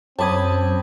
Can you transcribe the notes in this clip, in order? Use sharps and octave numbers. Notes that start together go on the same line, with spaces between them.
F#2 C4 C#5 A5 B5 D6 D#6 G#6